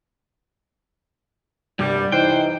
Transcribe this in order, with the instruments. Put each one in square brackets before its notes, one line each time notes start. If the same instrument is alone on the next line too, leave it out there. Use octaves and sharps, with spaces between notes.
[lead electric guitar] C2 G2 [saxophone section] G3
[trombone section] E3 D#4 [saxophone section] B4 C5 [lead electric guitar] G5